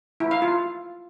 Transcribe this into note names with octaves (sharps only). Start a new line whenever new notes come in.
E4
F5
F4